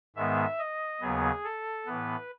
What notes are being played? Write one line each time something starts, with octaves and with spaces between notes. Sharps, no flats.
G#2 D#3 G#3 B3 E5
D#5
D#2 C#3 F#3 B3 G#4
A4
A2 E3 B3 B4